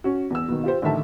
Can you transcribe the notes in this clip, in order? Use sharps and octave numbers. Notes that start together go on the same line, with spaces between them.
C#4 F#4
E2 E6
B2 D#3
F4 G4 C5
A1 D3 D#3 E5 A5